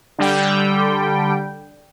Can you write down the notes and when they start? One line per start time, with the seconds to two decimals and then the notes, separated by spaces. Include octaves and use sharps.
0.18 D3 G3 G5